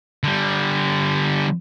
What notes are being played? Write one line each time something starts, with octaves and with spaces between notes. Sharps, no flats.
D3 G3